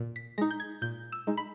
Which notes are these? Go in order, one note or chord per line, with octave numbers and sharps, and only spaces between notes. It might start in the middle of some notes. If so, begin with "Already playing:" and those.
Already playing: A#2
B6
G#3 D#4 A#6
G6
G#6
A#2 G6
E6
G#3 D#4
B5